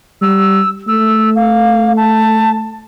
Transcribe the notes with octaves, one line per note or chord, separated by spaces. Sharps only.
G3 E6
A3 E6
F5
A5